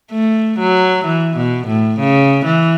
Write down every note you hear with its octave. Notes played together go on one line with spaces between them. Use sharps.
A3
F#3
E3
B2
A2
C#3
E3